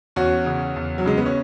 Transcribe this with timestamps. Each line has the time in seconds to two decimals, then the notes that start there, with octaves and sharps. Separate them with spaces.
0.16 E2 C#4 F#4
0.46 C#3
0.76 E2
0.98 F#3
1.06 C#3 G#3
1.17 B3
1.26 C#4